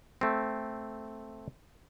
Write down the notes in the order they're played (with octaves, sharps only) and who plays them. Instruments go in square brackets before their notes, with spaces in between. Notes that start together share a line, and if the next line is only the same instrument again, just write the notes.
[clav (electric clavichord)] A3 C4